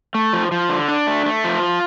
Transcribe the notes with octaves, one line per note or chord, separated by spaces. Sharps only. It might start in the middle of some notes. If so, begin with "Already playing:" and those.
A3
F3
F3
D3
D4
A3
A3
F3
F4